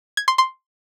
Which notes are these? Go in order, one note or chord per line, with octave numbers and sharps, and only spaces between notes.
G#6
C6
C6